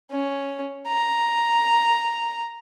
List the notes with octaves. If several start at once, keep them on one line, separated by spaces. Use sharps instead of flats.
C#4
A#5